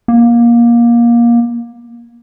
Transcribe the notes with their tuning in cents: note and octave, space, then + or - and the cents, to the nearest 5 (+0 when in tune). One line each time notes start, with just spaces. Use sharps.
A#3 +20